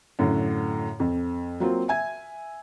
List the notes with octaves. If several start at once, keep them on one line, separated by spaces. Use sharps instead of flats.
F#2 A2 D3
F2
F#3 A#3 C4 F4
E5 G#5 G#6